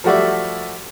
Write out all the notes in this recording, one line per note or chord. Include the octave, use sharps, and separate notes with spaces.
F3 G3 A3 F#4 D5 E5